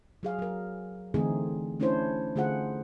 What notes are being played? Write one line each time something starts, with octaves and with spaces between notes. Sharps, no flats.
F#3 G#4 F5
F#3 A#4
D3 E3 A3 C4 D#4 G#4
A3 C#4 D4 E4 C5 C#5
D3 A3 F4 G#4 C5 F#5